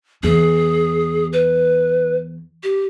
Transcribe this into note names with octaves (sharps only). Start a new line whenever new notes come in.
E2 G#4
B4
G4